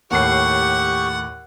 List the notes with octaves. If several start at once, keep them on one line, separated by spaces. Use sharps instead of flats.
D#2 A2 G4 F#5 C#6 C7